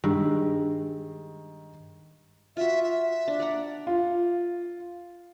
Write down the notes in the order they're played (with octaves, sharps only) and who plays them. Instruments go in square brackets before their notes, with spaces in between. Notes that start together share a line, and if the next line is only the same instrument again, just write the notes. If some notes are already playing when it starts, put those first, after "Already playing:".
[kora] G2 [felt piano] D#3 G#3
[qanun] F4 F#4 [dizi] E5
[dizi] E5
[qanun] D4
D5 F#5 A#5
[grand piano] F4